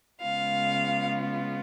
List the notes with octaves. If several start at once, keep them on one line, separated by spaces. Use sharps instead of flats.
C#3 G#3 B3 F4 F5